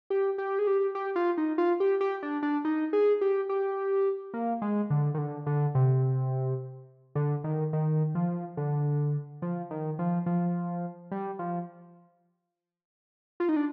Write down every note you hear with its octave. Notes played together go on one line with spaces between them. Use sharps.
G4
G4
G#4
G4
G4
F4
D#4
F4
G4
G4
D4
D4
D#4
G#4
G4
G4
A#3
G#3
D3
D#3
D3
D3
C3
D3
D#3
D#3
F3
D3
F3
D#3
F3
F3
G3
F3
F4
D#4
D4